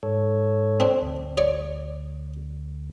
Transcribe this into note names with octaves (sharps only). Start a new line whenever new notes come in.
G#2 A4 C#5
C4 D4
D2
C#5 D5 C#6